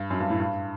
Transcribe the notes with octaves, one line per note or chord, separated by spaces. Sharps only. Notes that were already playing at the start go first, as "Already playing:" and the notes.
Already playing: G2
F#2
G2
A2
G2